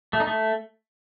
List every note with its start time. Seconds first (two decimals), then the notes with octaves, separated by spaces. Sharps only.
0.13 A3
0.20 D#4
0.27 A3